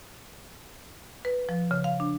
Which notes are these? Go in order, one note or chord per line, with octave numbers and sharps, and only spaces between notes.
B4
F3
C#3
F5
D4